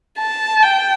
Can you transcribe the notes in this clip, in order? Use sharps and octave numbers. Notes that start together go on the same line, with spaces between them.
A5
G5